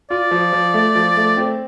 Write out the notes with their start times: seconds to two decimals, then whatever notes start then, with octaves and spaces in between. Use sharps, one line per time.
0.10 F4 D5
0.31 F3
0.53 F3
0.74 A3
0.95 F3
1.16 A3
1.37 C4